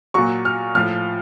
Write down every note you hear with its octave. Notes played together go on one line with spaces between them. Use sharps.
A#2 F#3 C#6
F6
A2 F3 F6